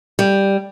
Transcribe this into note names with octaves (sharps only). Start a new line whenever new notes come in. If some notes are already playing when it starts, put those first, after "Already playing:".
G3